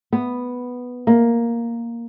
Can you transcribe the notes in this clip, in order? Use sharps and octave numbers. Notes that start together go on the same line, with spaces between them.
B3
A#3